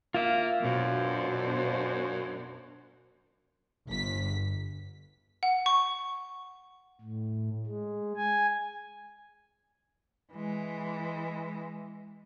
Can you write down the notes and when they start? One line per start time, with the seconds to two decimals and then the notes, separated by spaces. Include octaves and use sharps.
0.14 A#3 F4 E5 F5
0.62 F#2 B2 D4 C5
3.87 G1 B6
5.43 F#5
5.66 C#6
7.01 A2
7.66 G#3
8.17 G#5
10.32 E3 G#3